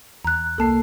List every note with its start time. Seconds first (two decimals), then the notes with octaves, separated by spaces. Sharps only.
0.24 E2 A#5 F#6
0.58 C2 A#3 A4 A5 C7